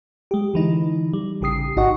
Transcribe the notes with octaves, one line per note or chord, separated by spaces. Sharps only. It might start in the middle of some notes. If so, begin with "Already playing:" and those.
G#3 G4
D3 E3 D#4
G3
A1 C#3 G4 D#6 C7
G#1 D#4 F#4 D#5 F#5 C#6